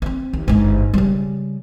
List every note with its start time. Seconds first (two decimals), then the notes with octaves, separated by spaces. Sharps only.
0.02 B3 C4
0.33 D#2
0.48 G1 G#2
0.94 C#3 G3